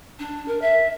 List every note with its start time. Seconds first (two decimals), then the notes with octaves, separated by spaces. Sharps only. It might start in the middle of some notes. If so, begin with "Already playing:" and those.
0.19 D4
0.48 A#4
0.62 E5